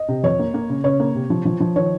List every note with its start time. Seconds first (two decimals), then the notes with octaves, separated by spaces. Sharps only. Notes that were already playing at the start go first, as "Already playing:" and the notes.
Already playing: D#5
0.08 C3
0.24 F2 C#5
0.39 A#3
0.54 A#3
0.70 C#3
0.84 C#3 C#5
1.00 A#3
1.15 C3
1.30 F3
1.45 F3
1.60 F3
1.76 D#3 C#5